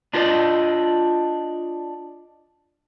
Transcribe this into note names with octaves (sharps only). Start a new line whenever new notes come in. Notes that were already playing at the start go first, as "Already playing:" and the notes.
D4 F4 A4 A#4 D5 D#5